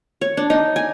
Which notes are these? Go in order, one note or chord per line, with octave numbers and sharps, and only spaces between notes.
C#5
D4
D#4
G#5